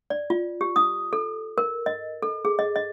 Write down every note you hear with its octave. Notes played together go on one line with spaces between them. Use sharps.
D5
F4
G4
D#6
A4
A#4
D#5
A4
G#4
D#5
D#5